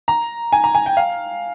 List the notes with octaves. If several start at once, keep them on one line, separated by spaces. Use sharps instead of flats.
A#5
G#5
A#5
G#5
G5
F5